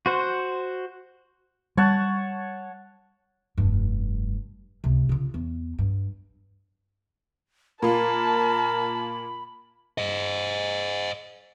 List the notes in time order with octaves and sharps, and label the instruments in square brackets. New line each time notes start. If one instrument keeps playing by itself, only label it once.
[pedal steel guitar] F#4 C5 F#5
[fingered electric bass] G3 [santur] C#5 F#5 A5
[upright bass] F1 G2
C#2 C3
C#3 F4
E2
G2
[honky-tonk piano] A#2 F4 [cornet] A#4 [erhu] A5 [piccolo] B5
[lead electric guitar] C5 D#5